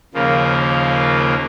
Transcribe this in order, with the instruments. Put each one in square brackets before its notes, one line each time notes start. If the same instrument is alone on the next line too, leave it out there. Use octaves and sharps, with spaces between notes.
[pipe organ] D#2 C#3 F3 A#3